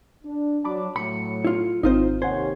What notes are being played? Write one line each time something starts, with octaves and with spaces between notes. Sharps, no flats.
D4
F#3 D4 A5 B5 D6
A2 F#3 B5 C#7
E4 F4
G#1 C4 D#4 F4 C5
D#2 C3 C#4 C5 F#5 G#5 G#6